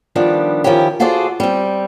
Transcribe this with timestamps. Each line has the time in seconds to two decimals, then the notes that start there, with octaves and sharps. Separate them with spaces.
0.16 D#3 F3 G3 B3 D4
0.64 D#3 F3 C#4 E4 G4
1.00 F4 F#4 G#4 A4 C5 D5
1.40 G3 C4